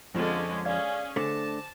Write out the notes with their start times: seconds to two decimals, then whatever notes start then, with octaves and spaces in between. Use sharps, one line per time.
0.15 F2 D3 F3 G#3 C#4
0.65 C#4 G#4 D5 F5 G#6
1.16 D3 A3 C5 A5 D6 A#6